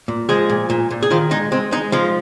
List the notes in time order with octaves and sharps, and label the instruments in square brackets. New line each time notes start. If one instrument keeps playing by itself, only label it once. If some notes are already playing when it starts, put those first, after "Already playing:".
[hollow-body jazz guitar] A#2
F3 G#3 G#4
A#2
A#2
A#2
G#4
D#3 F3 F4
G#3 D#4
G#3 C4
G#3 D#4
F3 G#3 F4